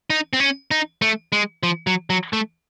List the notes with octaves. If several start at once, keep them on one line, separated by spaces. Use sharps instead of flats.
D#4
C4
C#4
D#4
A3
G#3
F3
F#3
F#3
A3